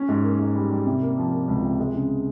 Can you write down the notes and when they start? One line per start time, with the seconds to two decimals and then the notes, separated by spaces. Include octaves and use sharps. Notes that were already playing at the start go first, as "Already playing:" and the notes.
Already playing: C#4
0.09 G#2
0.24 A#3
0.39 G#2
0.55 G3
0.71 G3
0.86 C3
1.02 A#3
1.18 F3
1.33 A#3
1.48 C#2
1.63 C3
1.79 G#3
1.94 C#3